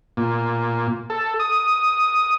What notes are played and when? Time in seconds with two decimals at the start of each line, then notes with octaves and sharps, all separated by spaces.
0.17 A#2
1.10 A4
1.39 D#6